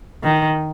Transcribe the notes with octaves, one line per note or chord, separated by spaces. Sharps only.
D#3